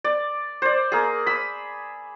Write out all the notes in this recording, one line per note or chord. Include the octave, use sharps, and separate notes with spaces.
D5
C5 D5
A#3 G#4
B5 E6